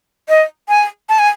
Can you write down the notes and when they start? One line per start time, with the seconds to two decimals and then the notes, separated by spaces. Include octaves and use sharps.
0.29 D#5
0.69 G#5
1.09 A5
1.19 G#5